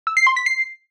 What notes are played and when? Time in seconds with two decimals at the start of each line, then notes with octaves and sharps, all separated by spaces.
0.07 E6
0.17 C7
0.27 C6
0.36 B6
0.46 C7